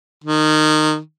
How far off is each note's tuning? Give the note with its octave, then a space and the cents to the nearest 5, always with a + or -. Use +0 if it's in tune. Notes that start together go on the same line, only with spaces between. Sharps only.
D#3 -20